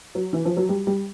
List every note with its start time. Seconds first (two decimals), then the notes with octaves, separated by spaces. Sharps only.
0.15 F#3
0.33 E3
0.45 F3
0.57 F#3
0.69 G3
0.87 G3